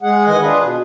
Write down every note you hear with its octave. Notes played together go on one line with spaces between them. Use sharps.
G#3 G#4 F#5
D#3 E3 D#5 F#5 G#5
D4 F4 G#4 B4
B2